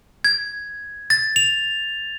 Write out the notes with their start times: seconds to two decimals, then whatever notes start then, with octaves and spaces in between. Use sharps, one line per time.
0.24 G#6
1.10 A6
1.36 F7